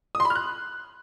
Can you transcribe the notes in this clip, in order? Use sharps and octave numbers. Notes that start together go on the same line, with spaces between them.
D#6
C6
B5
F6
F#6